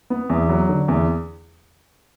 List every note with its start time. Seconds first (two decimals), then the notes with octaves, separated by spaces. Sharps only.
0.10 B3
0.30 E2
0.49 F#3
0.69 D3
0.88 E2